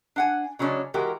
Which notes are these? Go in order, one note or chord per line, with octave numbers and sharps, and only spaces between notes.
D4 F#5 G#5
C#3 F#3 G#3 C#4 D4
E3 G#3 F#4 G4 A#4